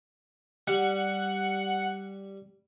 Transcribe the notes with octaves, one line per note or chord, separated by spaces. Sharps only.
G3 F#5